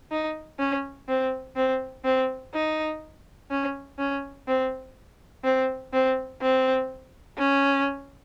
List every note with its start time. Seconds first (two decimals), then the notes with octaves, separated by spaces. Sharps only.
0.11 D#4
0.59 C#4
1.08 C4
1.56 C4
2.04 C4
2.54 D#4
3.50 C#4
3.98 C#4
4.47 C4
5.44 C4
5.93 C4
6.41 C4
7.38 C#4